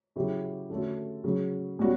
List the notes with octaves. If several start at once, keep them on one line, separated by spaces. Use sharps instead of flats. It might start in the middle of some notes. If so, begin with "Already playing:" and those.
C#3 F#3 C#4 E4 G4
D3 A3 C#4 F#4 A4
C#3 F#3 C#4
B2 G3 C#4 F#4